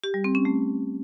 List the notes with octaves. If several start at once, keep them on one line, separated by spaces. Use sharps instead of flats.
G4
G3
C4
C#4
A3